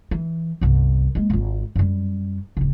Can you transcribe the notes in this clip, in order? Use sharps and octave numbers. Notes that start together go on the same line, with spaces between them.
E3
G1 C2
G#3 A#3
G#1 F4
F#2 G3
D1 C#3